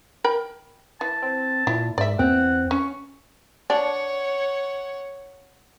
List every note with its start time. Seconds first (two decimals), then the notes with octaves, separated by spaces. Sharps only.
0.24 A#4 G5 B5
1.01 E3 A5
1.22 C4
1.67 A#2 E4
1.98 G#2 D5 E5
2.19 E2 C4 F#5
2.71 C#4 C#6
3.70 D4 C#5 F#5